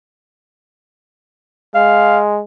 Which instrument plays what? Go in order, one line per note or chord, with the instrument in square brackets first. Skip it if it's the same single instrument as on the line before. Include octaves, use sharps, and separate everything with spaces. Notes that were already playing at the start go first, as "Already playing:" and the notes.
[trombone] G#3 [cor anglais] F5